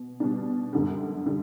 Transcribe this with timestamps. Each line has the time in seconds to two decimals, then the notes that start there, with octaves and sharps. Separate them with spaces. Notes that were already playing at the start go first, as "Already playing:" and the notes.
Already playing: B2
0.20 B2 G3 D4
0.73 F#2 D3 G3
1.26 D3 G3